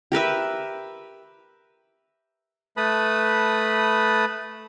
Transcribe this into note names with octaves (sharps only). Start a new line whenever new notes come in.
G4 A#4 B4 E5
A3 B4 A5 B5 D#6